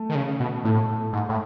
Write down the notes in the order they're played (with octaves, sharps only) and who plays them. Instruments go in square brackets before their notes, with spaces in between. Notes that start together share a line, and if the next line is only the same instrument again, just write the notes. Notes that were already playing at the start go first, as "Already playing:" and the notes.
Already playing: [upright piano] A3
[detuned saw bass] D#3
C#3
B2
[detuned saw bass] A2 [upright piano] A3
[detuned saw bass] G#2
A2